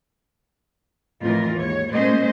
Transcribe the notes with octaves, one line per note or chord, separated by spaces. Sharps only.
F2 A2 E3 F4 A#4
D#2 G#2 C#5
A#2 G#3 A3 C#4 C5 D#5